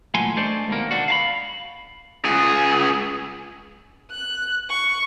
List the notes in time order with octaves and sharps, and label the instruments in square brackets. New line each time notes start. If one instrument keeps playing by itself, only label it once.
[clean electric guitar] A#2 E3 F#3 A3 G#5 C6
G#3 A3 D4 C5 D5
D#2 B2 A#3
D3 D4 F#4
F5 A5 B5
[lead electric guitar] C#2 G#4
[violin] F#6
C#6